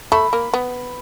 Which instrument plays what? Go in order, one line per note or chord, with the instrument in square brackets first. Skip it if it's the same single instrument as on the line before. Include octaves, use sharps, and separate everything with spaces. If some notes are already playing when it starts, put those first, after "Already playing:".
[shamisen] A3 [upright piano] B5
[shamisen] A#3
B3